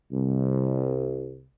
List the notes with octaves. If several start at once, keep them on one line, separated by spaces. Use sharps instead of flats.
C2